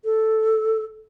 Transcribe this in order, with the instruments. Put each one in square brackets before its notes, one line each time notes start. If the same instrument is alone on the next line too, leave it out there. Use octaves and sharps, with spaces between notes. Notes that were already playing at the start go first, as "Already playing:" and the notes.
[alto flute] A4